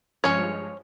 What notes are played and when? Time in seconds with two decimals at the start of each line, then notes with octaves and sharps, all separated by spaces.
0.24 G2 F3 G#3 C#4 C#5